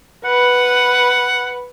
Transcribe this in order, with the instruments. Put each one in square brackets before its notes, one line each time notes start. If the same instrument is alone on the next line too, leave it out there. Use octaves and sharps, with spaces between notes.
[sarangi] B4 [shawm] F#5